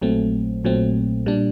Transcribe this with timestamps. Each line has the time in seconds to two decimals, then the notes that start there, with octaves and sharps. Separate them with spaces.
0.01 A#1 A#2 F#3 A3 C4
0.64 A#1 A#2 F#3 A3 C4
1.26 A#2 G3 D4